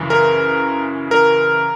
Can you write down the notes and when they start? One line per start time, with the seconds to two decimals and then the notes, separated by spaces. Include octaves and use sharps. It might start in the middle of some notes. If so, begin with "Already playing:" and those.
Already playing: F#2 C#3 E3
0.10 A#4
1.11 A#4